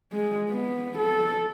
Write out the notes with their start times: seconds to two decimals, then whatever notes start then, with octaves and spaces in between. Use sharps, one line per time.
0.13 G#3
0.51 B3
0.98 A4